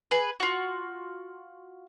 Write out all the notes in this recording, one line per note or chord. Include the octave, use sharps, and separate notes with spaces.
G#4 B4
F4 F#4